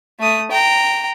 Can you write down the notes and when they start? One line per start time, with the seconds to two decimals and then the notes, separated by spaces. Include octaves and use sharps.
0.20 A3 D#6
0.51 G5 A#5